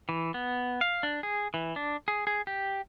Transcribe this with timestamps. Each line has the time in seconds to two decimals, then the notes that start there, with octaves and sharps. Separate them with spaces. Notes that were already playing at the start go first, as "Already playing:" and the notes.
0.09 E3
0.34 B3
0.81 F5
1.03 D4
1.23 G#4
1.54 E3
1.76 D4
2.08 G#4
2.27 G#4
2.47 G4